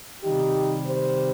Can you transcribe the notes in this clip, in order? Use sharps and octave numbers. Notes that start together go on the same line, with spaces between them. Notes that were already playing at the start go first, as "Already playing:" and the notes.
C3 D#3 G3 D#4 G4
G4 C5